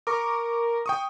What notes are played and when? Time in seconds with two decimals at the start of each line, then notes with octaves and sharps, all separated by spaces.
0.07 A#4 C#6 D6
0.86 G5 C#6 D#6